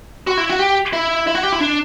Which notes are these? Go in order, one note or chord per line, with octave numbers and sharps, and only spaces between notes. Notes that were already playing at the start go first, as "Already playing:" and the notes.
F#4
E4
F#4
G4
E4
E4
F#4
G4
E4
D4